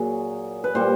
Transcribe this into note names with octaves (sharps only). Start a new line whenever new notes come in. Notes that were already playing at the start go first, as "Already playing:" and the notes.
Already playing: A#2 F#3 G#4
B4
A#2 G3 C5